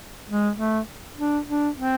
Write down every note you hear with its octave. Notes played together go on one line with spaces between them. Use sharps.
G#3
A3
D4
D4
C4